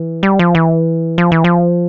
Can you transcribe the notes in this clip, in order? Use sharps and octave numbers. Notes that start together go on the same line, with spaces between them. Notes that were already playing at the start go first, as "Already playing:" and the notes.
Already playing: E3
G3
F3
E3
F3
E3
F3